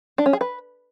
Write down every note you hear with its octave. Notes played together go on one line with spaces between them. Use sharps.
D4
C#4
G#4
B4